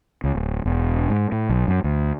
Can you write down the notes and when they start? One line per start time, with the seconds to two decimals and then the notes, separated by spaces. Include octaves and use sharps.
0.24 C#2
0.35 D1
0.65 E1
1.10 G#2
1.32 A2
1.49 B1
1.68 F#2
1.84 D2